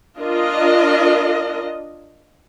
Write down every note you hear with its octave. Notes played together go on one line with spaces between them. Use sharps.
D4 F4 A#4 D#5